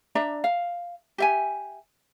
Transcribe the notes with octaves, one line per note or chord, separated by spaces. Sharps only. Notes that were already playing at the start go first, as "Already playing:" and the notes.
D4 D5 E5 A#5
F5
G4 E5 G#5